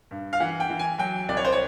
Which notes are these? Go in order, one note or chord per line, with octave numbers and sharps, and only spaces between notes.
G2
F5
E3 F#5
G5
E3
G#5
F#3 G5
C2 D5
C#5
C5
C#5